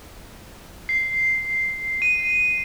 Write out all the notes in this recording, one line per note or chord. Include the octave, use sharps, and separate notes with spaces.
C7
D#7